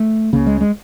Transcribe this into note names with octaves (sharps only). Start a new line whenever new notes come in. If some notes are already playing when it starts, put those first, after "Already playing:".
Already playing: A3
C#2 C#3 A#3
G#3
G#3